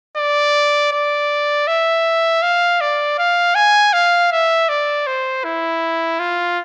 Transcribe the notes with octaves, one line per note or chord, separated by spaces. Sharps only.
D5
D5
E5
F5
D5
F5
G#5
F5
E5
D5
C5
E4
F4